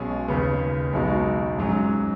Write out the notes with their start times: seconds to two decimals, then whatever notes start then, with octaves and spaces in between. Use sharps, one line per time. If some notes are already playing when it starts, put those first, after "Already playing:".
Already playing: B1 B2 G#3 C#4 G#4
0.28 D#2 C#3 B3
0.93 B1 B2 G#3 D#4 F#4
1.58 G#2 F#3 C#4